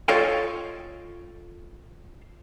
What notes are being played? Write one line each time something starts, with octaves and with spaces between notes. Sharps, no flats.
F4 A4 C#5 D#5 F5 G5